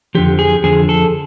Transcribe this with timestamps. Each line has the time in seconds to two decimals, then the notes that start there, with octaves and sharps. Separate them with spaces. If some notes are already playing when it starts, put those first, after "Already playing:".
0.15 F2 D3 F3 G4
0.39 G#4
0.64 F2 D3 F3 G#4
0.89 A4